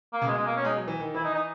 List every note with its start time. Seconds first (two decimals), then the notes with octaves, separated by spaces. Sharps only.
0.13 A#3
0.22 C#3
0.27 B2 G#3
0.37 G#3
0.46 A#3
0.56 C#4
0.65 G#3 D#4
0.77 F#3
0.88 E3
1.00 D#3
1.14 E3 E4
1.24 D#4
1.34 D#4